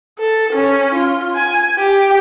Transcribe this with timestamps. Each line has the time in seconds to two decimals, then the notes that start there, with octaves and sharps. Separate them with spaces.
0.19 A4
0.53 C#4
0.94 F4
1.35 G#5
1.79 G4